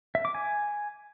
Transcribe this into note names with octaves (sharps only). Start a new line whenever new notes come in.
E5
D6
G#5